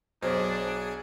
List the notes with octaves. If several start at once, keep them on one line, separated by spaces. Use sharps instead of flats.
B1 D4 G#4 C5